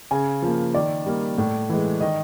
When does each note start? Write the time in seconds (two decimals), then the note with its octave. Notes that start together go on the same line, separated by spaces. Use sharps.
0.11 C#3 G#5
0.42 F3 A#3
0.75 D#3 D5
1.06 G3 A#3
1.38 A2
1.69 E3 G#3
2.01 D#3 D#5